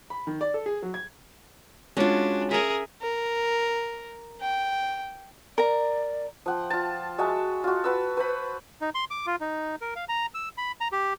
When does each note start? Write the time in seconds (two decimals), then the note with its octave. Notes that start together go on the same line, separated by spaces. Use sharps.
0.10 B5
0.27 D#3
0.41 D5
0.54 A4
0.66 G#4
0.83 F#3
0.94 G#6
1.97 G#3 C#4 D4 F4 F#4 C#5
2.51 G#4 A#4 E5 G#5
3.02 A#4
4.41 G5
5.58 A#4 D5 A#5
6.46 F3 F#5 G5
6.70 F4 A5
7.18 G#3 F#4 E5 A5
7.64 F4 F#4
7.84 F#4 B4 E6
8.17 B4 C5 B5
8.81 D#4
8.95 C6
9.11 D6
9.26 F4
9.41 D#4
9.81 A#4
9.96 F5
10.09 A#5
10.34 E6
10.58 B5
10.81 A#5
10.92 G4